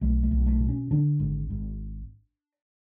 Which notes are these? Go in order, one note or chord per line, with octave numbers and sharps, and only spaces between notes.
B1 A3
A3
B1
A3
B2
C#4
D3 D4
G#1
G#1